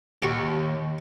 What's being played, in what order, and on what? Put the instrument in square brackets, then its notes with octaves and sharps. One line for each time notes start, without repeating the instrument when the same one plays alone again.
[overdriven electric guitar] D#2 [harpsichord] G4 F#5 C#6